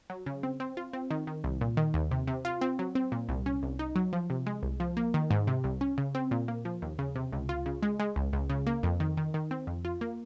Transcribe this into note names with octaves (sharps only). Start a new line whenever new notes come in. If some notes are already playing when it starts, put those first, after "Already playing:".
F#3
C#3
C4
C4
F4
C4
D#3
D#3
C2
A#2
D#3
D#2
C3
C3
F4
C4
F#3
C4
A#2
C2
C#4
C2
D#4
F#3
F3
C3
G#3
C2
F3
A#3
D#3
G#2
C3
C2
C#4
C#3
C4
A#2
A#3
F3
D#2
C#3
C3
C#2
F4
C#3
G#3
G#3
C#2
C#2
C#3
A#3
F2
D#3
D#3
D#3
C4
F2
F4
A#3